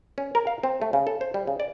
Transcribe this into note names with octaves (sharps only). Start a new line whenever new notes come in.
C#4
A#4
F5
C4
A3
C#3
A4
C5
G3
C#3
D5